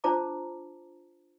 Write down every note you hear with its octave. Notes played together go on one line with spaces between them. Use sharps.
D4 F4 C5 A5 A#5 D6